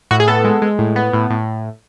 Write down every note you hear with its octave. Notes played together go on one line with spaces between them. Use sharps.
A2 F#4
G#4
B3 A4
G#3
G#3
A2
B3
A2
A2